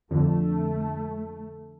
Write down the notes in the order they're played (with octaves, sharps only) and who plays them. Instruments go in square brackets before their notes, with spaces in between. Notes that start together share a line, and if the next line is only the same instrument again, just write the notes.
[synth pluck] F2 D3 [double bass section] A3